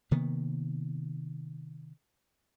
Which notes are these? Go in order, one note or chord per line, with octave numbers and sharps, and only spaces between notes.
C3 D#3 A#3 B3